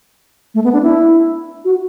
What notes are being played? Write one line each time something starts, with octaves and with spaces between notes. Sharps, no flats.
A3
B3
D4
E4
F#4